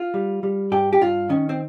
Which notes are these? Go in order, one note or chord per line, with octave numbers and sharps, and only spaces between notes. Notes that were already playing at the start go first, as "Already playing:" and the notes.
Already playing: F4
G3
G3
G2 G4
G4
G2 F4
D#3 C#4
C4